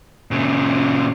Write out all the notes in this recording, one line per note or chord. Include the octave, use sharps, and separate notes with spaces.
A#2 C#3